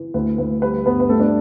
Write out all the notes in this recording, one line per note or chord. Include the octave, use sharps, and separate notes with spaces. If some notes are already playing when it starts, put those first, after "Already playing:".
Already playing: E3
D2 B4
D2 B4
G3 B4
G2 B3 B4
B4
G3 A3 A4
D4